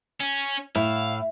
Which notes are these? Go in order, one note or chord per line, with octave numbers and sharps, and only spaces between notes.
C#4
A2 E4 F5